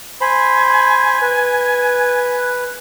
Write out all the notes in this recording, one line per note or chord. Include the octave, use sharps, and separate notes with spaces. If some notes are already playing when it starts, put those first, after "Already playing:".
C5 G#5 B5
B4